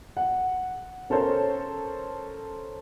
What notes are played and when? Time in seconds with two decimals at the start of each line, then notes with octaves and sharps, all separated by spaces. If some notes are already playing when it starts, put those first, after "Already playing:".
0.17 F#5
1.10 C#4 A4 A#4 C5 C#5